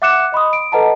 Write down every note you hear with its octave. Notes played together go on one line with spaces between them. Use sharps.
E5 F#5 D6 F#6 C#7 E7
D#5 B5 C6 D#6
D7
A4 B4 D#5 F#5 A5 A#5